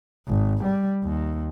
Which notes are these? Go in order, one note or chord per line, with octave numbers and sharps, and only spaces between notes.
G#1
G3
D#2